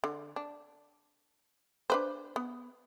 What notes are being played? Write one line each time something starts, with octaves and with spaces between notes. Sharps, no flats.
D3
D4
D4 B4 C5
B3